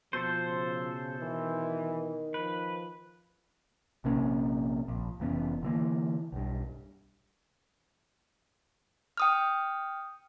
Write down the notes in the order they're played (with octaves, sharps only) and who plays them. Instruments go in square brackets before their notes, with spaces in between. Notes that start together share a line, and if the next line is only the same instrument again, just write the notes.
[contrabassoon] B2 [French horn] F3 [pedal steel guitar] A4 C5
[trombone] C#3
[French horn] D#3 [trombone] E3
[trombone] F3 [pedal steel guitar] B4
[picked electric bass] A#1 C3 A#3 C#4
A#1
F1 E3 B3 C#4
D3 E3 A#3
B1 G2
[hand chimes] G5 D#6 F6